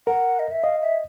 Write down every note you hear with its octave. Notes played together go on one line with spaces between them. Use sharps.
A#4 F#5
D#5
E5
D#5 F5
E5